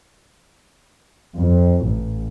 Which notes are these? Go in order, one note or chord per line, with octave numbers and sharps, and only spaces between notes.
F2
A1